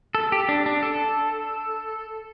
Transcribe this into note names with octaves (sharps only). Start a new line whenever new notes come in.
A4
G4
D4
D4
A4